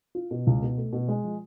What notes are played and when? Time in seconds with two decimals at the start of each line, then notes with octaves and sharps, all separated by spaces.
0.15 F4
0.31 B2
0.47 C#2
0.62 B2
0.77 A3
0.93 B2
1.08 G#3
1.24 F3